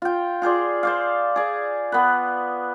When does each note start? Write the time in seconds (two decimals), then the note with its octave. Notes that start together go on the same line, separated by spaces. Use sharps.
0.02 F4 G5
0.42 F4 G#4 C5 D5
0.83 C5 D5 F5
1.36 G#4 D5
1.92 B3 B4